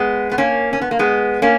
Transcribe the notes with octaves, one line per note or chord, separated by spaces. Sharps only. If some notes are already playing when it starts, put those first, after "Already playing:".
Already playing: G#3 B3
B3
A#3 C#4
C#4
B3
A#3
G#3 B3
A#3 C#4